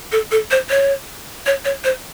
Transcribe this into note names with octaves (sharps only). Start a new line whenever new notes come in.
A4
A4
C5
C#5
C#5
C#5
C5